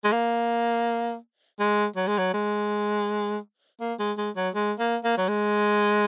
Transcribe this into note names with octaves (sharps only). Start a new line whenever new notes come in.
G#3
A#3
G#3
F#3
G#3
F#3
G#3
A#3
G#3
G#3
F#3
G#3
A#3
A#3
F#3
G#3